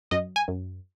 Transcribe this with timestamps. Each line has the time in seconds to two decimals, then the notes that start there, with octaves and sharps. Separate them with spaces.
0.11 F#2 D#5
0.36 G#5
0.48 F#2